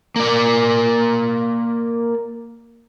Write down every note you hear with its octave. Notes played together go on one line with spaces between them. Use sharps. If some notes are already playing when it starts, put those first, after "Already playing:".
A#3 D5